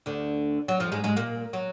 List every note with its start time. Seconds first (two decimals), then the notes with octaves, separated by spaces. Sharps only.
0.06 D2 D3
0.68 F#3
0.80 F2 F3
0.92 G#2 G#3
1.04 G#2 G#3
1.16 A#2 A#3
1.53 F#3